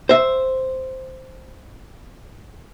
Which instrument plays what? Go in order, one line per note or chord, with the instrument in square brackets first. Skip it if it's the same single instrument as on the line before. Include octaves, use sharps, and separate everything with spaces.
[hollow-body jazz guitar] C5 E5